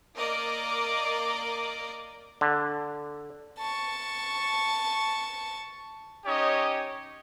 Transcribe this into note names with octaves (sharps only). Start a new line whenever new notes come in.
A#3 A#4 D5 D#5 D6
D3
A5 C#6
C#4 D#4 G4 C#5 D#5